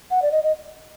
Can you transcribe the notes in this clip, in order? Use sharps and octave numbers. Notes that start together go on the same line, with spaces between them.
F#5
D5
D#5
D#5